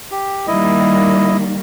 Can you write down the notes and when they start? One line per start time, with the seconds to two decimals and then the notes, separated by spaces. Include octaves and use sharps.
0.11 G4
0.47 D#3 G3 A#3 E4 D#5